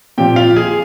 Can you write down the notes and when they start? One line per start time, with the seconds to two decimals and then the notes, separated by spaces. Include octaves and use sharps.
0.18 A#2 F3 C4 G4 G5
0.36 F4 F5
0.56 G#4 G#5